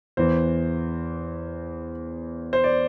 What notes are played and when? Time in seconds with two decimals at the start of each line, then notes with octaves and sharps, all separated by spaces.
0.17 E2 E3 C5
2.53 C5
2.64 D5